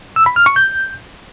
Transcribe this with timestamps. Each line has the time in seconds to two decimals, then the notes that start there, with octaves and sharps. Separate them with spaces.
0.16 E6
0.26 B5
0.36 F6
0.46 C#6
0.56 G6